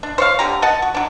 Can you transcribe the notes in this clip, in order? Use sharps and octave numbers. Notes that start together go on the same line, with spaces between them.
D4
C5 C#5 F5
D3 G4 A#5
D#5 F#5 A5
F#4
F#3 D4